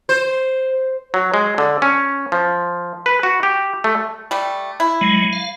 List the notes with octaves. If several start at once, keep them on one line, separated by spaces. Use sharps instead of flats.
C5
F#3
G#3
D3
C#4
F3
B4
F#4
G4
A3
G3 A3
E4
F#3 G#3
F5